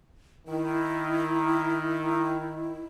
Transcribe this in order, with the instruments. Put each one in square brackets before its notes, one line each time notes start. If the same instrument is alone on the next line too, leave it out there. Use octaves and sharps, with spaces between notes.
[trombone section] D#3 [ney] E4